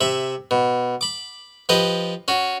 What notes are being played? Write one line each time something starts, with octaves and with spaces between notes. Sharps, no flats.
C3 E5 B5
B2
B5 D6
F3 G4 B4 D#5
C#4 F#4